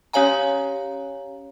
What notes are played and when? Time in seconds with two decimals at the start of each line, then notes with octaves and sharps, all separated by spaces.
0.13 C#4 G4 C#5 F5 G#5 A#5